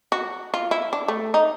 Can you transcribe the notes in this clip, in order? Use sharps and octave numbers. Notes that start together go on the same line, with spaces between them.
F#4
F4
E4
D4
A3
D#4